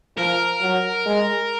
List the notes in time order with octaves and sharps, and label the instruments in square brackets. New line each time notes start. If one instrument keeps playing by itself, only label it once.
[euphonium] F3 [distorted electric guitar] A#4
[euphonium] F#3
G#3